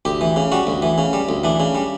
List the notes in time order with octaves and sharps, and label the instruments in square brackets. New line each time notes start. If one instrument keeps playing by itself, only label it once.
[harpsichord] D2 G4
E3
C#3
G3 F#4
D2
E3
C#3
G3
D2
E3 D4
C#3
G3